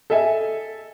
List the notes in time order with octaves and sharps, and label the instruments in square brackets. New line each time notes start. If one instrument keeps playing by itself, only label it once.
[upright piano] A4 D#5 E5 G#5